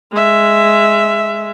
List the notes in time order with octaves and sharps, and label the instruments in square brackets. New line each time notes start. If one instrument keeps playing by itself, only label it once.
[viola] G#3 E5